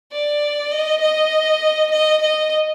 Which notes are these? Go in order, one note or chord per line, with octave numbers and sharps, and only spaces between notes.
D5
D#5
D#5
D#5
D#5